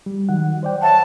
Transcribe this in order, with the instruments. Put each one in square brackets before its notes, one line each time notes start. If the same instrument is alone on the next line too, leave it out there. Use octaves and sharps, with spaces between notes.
[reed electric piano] G3
D#3 F#3 F#5
C5 D5 G5
[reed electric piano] C#5 E5 F#5 [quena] A5